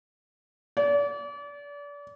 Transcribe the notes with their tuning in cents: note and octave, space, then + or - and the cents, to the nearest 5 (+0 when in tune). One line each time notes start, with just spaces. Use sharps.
D5 -35